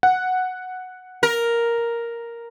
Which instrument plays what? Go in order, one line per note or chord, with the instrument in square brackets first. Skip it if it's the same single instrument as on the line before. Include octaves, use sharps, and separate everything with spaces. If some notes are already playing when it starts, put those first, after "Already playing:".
[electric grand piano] F#5
[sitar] A#4